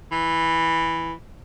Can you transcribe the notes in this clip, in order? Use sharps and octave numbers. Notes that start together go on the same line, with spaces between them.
E3